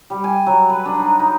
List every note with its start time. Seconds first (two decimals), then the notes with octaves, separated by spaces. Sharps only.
0.10 G3
0.24 G#5
0.46 F#3
0.70 B4
0.86 D4
0.99 D#4
1.19 D#4